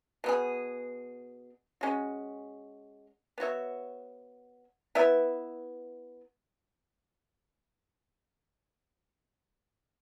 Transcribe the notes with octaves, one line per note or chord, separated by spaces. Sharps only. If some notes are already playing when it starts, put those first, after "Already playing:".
B2 B3 G#4
G#3 C#4 F#4
B3 F#4 C#5 E5
B3 E4 B4 E5